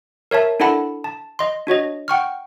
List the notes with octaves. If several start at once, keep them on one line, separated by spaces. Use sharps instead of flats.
A#4 C#5 E5 A5
D4 E4 A4 F#5 A5 B5
A5
D#5 C6
D4 F#4 C#5 D#5
F#5 G5 C#6 F6